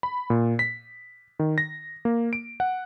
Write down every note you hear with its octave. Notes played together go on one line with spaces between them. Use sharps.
B5
A#2
B6
D#3
A#6
A#3
D7
F#5